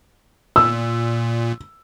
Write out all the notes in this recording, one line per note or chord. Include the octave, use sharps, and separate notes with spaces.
A#2 E6